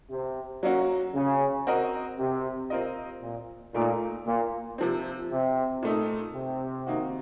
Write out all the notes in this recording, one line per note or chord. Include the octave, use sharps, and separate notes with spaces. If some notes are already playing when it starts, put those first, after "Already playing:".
C3
F#3 A#3 C#4 F#4
C#3
C4 F#4 A#4 D#5
C3
C4 F4 A#4 D#5
A#2
A#2 A3 D#4 A#4
A#2
C3 F3 C4
C3
A#2 A3 D#4
C3
D#3 A#3 D#4 F#4